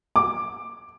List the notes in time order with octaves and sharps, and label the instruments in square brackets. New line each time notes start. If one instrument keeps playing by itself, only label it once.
[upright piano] D6